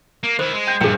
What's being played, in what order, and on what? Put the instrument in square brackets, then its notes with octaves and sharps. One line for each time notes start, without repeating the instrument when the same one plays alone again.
[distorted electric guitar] A#3
[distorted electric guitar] D#3 E4 [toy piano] C5
[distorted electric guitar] G#3
[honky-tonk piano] G5 G6
[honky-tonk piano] A#1 G2 [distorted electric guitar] A#2 D#3 [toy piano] G#4 G5